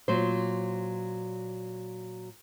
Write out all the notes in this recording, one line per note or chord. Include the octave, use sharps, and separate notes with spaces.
A#2 F#3 C5